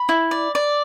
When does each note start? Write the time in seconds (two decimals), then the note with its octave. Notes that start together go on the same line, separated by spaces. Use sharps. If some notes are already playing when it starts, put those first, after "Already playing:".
Already playing: B5
0.09 E4
0.31 D5
0.55 D5